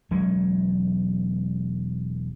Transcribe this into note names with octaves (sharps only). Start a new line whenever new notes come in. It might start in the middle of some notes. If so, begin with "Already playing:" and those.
E1 F#3 G#3 C#4